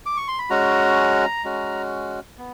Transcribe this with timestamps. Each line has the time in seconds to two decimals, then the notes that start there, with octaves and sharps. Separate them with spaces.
0.06 D6
0.17 C#6
0.28 C6
0.39 B5
0.50 G#3 C#4 F#4 A#5
1.44 G#3 C#4 F#4
2.39 B3